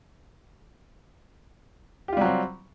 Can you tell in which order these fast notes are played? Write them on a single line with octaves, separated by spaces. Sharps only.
G4 F4 G3 F#3 C4